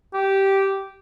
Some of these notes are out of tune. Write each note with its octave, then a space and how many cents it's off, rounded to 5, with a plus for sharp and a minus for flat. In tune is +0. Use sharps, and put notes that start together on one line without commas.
G4 -10